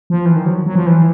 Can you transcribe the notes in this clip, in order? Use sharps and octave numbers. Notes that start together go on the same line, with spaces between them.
F3
E3
D#3
F#3
F#3
F3
E3